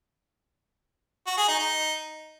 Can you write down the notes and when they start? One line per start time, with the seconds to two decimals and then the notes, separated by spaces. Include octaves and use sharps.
1.27 F#4
1.37 G#4
1.48 D#4
1.59 D#4